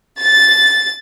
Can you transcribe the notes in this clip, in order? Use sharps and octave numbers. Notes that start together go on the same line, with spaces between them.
A6